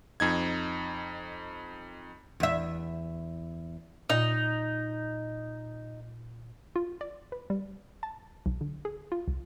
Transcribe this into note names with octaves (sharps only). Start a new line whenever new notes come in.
F2 D#4 G#6
E2 E5
A#2 D#4
F4
D5
B4
G3
A5
B1
D3
G#4
F4
C2